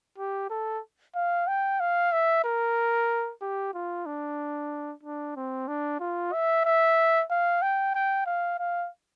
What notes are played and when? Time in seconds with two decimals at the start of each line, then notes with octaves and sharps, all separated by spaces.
0.18 G4
0.50 A4
1.15 F5
1.47 G5
1.80 F5
2.12 E5
2.44 A#4
3.42 G4
3.74 F4
4.06 D4
5.03 D4
5.36 C4
5.68 D4
6.00 F4
6.33 E5
6.65 E5
7.30 F5
7.62 G5
7.95 G5
8.26 F5
8.59 F5